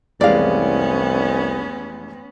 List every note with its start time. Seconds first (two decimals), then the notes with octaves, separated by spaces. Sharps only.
0.21 F1 C2 E3 G#3 B3 C#4 D5 F5